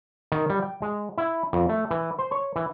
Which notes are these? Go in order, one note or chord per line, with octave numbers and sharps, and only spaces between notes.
D#3
G3
G5
G#3
E4
F2
A3
E3
C5
C#5
E3